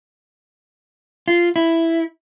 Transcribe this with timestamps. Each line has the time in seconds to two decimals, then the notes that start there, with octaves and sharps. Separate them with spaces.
1.28 F4
1.56 E4